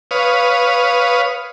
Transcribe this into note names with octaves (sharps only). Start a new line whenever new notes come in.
B4 C#5 F5 D#6